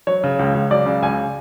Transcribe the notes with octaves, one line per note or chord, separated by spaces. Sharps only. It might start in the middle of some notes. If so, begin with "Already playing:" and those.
F#3 C#5
C#3
C#2
C#2
F#3 D5
C#3
C#2 G#5